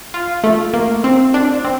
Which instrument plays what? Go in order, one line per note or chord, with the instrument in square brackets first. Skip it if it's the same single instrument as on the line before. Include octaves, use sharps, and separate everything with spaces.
[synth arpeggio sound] F4
A3
A#3
C4
D4
C4